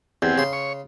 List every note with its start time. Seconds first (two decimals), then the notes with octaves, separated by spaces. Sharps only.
0.22 E2 C4 G4 G#4
0.38 C#3 C6
0.53 C#5 C#6